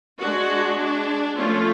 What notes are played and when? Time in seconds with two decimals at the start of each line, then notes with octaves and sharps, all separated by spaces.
0.19 G#3 D4 F#4
0.78 D4
1.37 F3 A3 C#4 F4